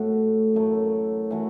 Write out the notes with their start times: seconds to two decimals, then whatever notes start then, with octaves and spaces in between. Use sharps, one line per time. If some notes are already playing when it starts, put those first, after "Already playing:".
Already playing: A2 A3 F#4
0.54 F#2 F#3 A3 E4
1.31 E3 A3 F#4